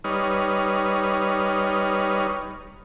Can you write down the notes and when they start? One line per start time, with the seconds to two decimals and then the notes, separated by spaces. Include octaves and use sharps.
0.04 G3 D#4 B4 C#5 D#6 F6